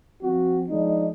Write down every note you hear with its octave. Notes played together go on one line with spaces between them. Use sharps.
F3 C4 F4 F#4
F3 G#3 D4 D#4